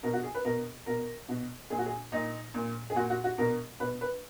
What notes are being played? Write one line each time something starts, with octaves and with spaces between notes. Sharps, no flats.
B2 A#4
F#4
G#4
B4
B2 A#4
B2 A#4
B2
A#2 G#4
F#4
G#4
A#2 D#4
A#2
G#4
A#2 F#4
F#4
F#4
B2 A#4
B2 B4
B4